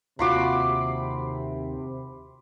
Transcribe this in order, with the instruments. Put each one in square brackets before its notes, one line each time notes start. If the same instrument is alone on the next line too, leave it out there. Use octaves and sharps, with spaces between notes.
[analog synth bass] D#2 [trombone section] C3 [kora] F4 F#4 [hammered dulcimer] B5 C6 D6